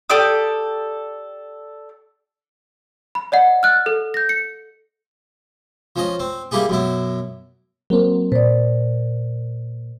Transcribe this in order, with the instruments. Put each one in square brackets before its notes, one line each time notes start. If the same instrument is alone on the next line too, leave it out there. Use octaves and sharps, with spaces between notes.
[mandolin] G4 A4 D5 D#6
[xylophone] B5
D5 D#5 F#5
F6 F#6 A6
A4
G6 A#6
C#7
[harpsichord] F3 C#4 D#5
C4
G3 A#3 E4 G4 G#4
F#2 B2 E4
[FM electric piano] F#3 A#3 C4 [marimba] A#4
[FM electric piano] A#2 [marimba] C5 D5